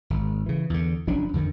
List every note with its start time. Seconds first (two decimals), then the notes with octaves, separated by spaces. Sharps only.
0.10 G#1
0.46 C#3 E3
0.70 E2 D3
1.07 F#1 F3 C#4 D4
1.34 F2 D3 D#3